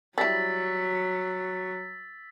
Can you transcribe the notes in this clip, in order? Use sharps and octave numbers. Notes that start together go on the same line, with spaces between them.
F#3 G3 E4 E6 A6 B6